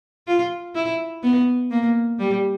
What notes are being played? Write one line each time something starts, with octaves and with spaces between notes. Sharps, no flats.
F4
E4
B3
A#3
G3